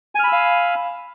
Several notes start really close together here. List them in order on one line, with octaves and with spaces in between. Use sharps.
G#5 F6 B5 E6 F5